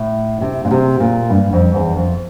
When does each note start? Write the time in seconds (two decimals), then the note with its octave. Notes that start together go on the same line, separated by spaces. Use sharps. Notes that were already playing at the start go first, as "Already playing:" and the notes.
Already playing: A2
0.41 C3
0.65 A#2
0.71 C3
1.00 A#2
1.30 G2
1.53 F2
1.75 E2
1.96 F2